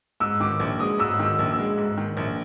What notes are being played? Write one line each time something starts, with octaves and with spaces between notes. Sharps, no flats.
G#2 E6
D#3 D6
A#1 D6
G#3 D#6
G#2 E6
D#3
E6
A#1
E6
G#3
G#2
D#3
A#1